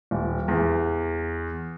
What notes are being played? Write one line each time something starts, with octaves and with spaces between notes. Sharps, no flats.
D#1
E2